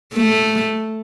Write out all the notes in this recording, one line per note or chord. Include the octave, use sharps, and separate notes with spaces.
A3